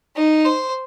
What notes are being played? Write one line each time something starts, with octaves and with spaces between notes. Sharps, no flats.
D#4
C5